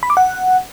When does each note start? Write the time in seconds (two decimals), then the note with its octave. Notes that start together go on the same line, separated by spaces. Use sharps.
0.03 B5
0.10 D6
0.17 F#5